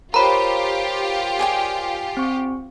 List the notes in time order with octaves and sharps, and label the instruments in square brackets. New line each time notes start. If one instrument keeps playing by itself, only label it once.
[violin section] F4 G4 [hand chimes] A#4 C5 C#5 [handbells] A#5 B5
[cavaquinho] G#4 D5 G5
[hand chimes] C4 C#6